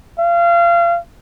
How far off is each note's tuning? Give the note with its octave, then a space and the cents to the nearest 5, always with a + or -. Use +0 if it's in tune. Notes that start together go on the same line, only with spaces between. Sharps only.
F5 -30